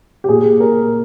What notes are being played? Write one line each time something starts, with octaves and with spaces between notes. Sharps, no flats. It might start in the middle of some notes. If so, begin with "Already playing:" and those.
G4
A#2 G#4
A#4